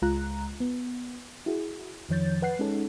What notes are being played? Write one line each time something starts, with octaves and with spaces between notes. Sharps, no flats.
C#2 G#3 F4 A#5 F#6
B3
E4 F#4 G#4
F2 D#3 F3 C#5 G6 A6
B4 F#5 F#6 C7
G#3 C#4 D#4 G#4 A4 C#5